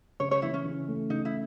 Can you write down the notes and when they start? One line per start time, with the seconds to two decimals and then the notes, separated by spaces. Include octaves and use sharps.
0.20 C#3 C#5
0.31 C#5
0.42 E3 E4
0.54 C#4
0.65 C#3
0.88 A3
1.10 C#3 D#4
1.25 E4